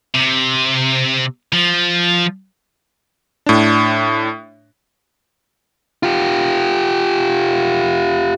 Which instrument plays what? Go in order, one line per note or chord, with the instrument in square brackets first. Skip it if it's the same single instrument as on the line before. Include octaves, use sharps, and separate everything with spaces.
[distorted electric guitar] C3
F3
[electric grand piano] A2 D4
[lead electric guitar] F4 G4